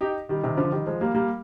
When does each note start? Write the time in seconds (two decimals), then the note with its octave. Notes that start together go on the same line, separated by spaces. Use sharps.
0.01 D#4 G4
0.29 D#3 G3
0.43 C3 D#3
0.57 D3 F3
0.72 D#3 G3
0.87 F3 G#3
1.01 G3 A#3
1.15 G3 A#3